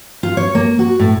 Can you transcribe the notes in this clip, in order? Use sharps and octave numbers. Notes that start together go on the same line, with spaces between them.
F4
C#5
A#3
F#4
A2